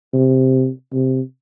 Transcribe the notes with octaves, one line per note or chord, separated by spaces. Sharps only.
C3
C3